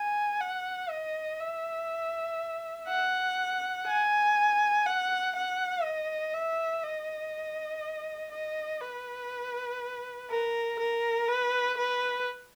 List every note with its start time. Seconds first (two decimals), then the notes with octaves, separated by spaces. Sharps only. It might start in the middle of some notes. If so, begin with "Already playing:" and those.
Already playing: G#5
0.40 F#5
0.90 D#5
1.40 E5
2.88 F#5
3.87 G#5
4.86 F#5
5.36 F#5
5.85 D#5
6.34 E5
6.83 D#5
8.32 D#5
8.81 B4
10.30 A#4
10.79 A#4
11.28 B4
11.78 B4